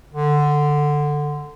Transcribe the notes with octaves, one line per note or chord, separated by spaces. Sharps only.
D3